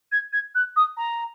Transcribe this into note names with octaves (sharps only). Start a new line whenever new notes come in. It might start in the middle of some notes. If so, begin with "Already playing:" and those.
G#6
G#6
F#6
D#6
A#5